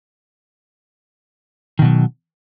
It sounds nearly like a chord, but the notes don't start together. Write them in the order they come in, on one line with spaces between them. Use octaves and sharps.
D#3 B2 F#3